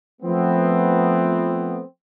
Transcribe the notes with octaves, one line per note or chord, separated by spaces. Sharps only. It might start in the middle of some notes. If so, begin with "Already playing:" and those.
F3 A3 B3 C4